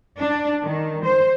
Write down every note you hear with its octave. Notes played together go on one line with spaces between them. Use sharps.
D4
D#3
C5